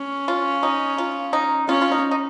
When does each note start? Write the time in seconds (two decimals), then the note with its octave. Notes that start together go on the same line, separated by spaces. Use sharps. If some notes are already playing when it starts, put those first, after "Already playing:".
Already playing: C#4
0.28 F4
0.63 D#4
0.98 F4
1.33 D#4
1.68 C#4 F4
1.82 F4
1.92 D#4
2.11 D#4